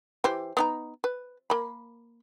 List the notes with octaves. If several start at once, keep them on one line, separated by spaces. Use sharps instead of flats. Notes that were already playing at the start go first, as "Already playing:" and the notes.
E3 G4 C5
B3 D#4 A#5
B4
A#3 B5